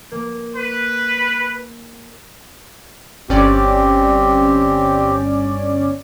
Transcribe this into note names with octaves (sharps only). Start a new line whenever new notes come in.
A#3
B4
G1 C4 C#4 G4 D5